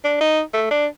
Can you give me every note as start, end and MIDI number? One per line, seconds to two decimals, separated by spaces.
0.04 0.19 62
0.21 0.41 63
0.53 0.69 57
0.71 0.86 62